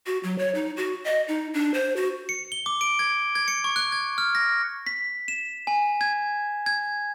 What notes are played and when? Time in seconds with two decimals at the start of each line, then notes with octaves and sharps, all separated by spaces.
0.07 F#4
0.23 F#3
0.38 C#5
0.55 D#4
0.77 F#4
1.04 D#5
1.28 D#4
1.54 D4
1.74 C5
1.96 F#4
2.29 C#7
2.52 G7
2.66 D6
2.81 D7
2.99 G#6
3.35 G#6
3.48 C#7
3.64 C#6
3.76 F#6
3.92 G#6
4.18 F6
4.35 A#6
4.87 B6
5.28 E7
5.67 G#5
6.01 G#6
6.66 G#6